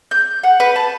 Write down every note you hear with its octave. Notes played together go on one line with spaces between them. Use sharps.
G6
F#5
B4
A5